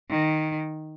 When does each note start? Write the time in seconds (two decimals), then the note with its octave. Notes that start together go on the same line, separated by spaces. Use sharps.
0.10 D#3